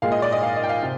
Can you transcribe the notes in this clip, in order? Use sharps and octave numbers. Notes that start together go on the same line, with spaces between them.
A#2 G#3 F5
D#5
D5
D#5
F5
D#5
G5
F5
C3